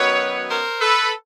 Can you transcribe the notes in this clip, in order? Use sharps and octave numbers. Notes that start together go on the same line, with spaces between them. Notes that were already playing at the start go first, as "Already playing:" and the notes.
Already playing: F#2 D#3 F#3 B3 B4 C#5
A#4 C5
A4 B4